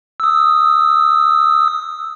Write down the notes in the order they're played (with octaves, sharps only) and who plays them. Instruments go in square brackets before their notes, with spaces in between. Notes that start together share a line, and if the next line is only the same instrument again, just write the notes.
[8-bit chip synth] D#6 E6